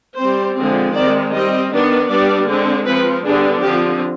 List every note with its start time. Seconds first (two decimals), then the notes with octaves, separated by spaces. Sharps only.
0.18 G3 C4 C5
0.56 D3 F3 G#3 C4
0.95 D#3 G#3 C4 D5
1.33 G3 C4 D#5
1.71 D#3 B3 D4
2.10 G3 B3 D4 D5
2.48 D3 G#3 C4
2.86 F3 C4 B4
3.24 D3 G3 B3 D4 G#4
3.62 D3 F3 C4 G4